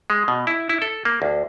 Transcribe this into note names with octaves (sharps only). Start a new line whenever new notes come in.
G#3
B2
E4
E4
A4
A#3
D2